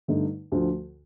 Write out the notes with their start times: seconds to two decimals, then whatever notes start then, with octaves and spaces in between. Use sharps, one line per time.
0.08 G2 D3 A3 D#4
0.52 D2 D3 F3